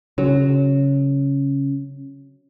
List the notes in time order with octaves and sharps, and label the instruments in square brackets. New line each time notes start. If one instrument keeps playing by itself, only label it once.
[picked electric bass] C#3 [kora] F#3